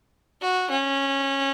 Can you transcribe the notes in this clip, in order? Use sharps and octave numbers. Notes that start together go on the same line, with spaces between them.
F#4
C#4